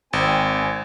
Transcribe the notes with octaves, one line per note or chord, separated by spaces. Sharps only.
G#1 C4 G#5